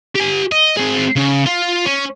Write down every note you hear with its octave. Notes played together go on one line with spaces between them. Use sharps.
G4 G#5
D#5
C4 G#4
C#3
F4
C#4